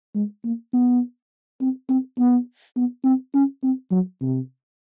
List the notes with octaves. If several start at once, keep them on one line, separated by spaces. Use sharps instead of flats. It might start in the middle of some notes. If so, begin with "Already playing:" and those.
G#3
A#3
B3
C4
C4
B3
B3
C4
C#4
C4
F#3
C3